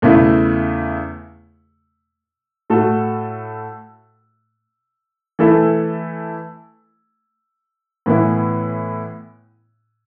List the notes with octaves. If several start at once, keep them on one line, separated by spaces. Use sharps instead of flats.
E2 C#3 A3 E4
A2 A3 F#4 A4
E3 A3 E4 A4
A2 E3 B3 E4